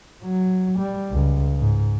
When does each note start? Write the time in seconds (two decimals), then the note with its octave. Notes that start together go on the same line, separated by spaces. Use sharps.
0.23 F#3
0.79 G3
1.11 C#2
1.59 G#2